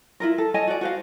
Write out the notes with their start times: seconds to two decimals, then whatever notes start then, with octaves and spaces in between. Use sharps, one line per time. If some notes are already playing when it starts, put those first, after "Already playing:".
0.20 E4 F4 A#4
0.38 A4
0.54 C#5 D#5 G#5 A5
0.67 F#4 D5
0.81 F#4 C5 F5